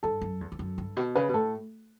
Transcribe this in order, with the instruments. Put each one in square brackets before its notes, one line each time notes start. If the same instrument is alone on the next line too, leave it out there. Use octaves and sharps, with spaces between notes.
[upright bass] G2 [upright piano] A4
[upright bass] F#2
E2
E2
F#2
G2
B2
[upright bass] C#3 [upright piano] B4
[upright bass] B2
[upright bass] A2 [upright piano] A4